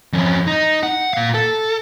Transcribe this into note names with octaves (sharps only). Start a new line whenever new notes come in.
F2 C#4
D#4
F#5
A#2 F5
A4